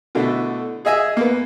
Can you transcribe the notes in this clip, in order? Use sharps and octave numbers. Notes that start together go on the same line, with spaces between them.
B2 D3 A3 E4
G#4 D#5 E5 G#5
A#3 B3